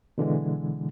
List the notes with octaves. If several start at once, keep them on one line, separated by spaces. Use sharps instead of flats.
B2 D3 E3 G#3